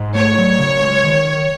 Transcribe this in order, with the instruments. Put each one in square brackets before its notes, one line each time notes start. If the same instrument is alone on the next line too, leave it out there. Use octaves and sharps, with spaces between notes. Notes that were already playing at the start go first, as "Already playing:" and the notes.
Already playing: [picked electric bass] G#2
[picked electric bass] A3 [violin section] C#5
[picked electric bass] F#3
C#3
G#3
D#3